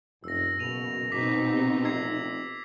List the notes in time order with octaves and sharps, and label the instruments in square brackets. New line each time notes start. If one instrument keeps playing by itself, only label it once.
[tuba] F1 [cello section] F#2 [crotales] E6 A#6
[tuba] F#1 [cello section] B2 [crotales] D#7 F7
[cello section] B2 C4 D#4 [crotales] D6 B6
[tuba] C3
[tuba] F1 [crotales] E6 G#6 C7